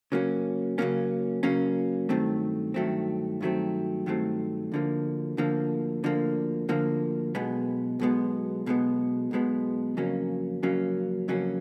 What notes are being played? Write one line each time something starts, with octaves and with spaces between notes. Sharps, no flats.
C#3 F#3 A#3 C#4
C#3 F#3 A#3 C#4
C#3 F#3 A#3 C#4
G2 D#3 F#3 A3 C4
G2 D#3 F#3 A3 C4
G2 D#3 F#3 A3 C4
G2 D#3 F#3 A3 C4
D2 D3 F3 A#3
D2 D3 F3 A#3
D2 D3 F3 A#3
D2 D3 F3 A#3
B1 B2 G#3 B3
B1 B2 G#3 B3
B1 B2 G#3 B3
B1 B2 G#3 B3
F2 C#3 F#3 A#3 C#4
F2 C#3 F#3 A#3 C#4
F2 C#3 F#3 A#3 C#4